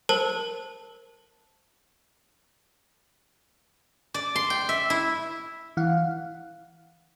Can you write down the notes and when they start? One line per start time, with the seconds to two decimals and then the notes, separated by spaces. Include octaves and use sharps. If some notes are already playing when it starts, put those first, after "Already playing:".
0.09 A#4 C5 A5
4.14 D5
4.36 C6
4.50 G5
4.69 E5
4.90 E4
5.77 E3 F5 F#5